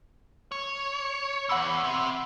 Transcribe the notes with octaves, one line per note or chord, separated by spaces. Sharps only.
C#5
E2 F#5 B5 E6
C4 E5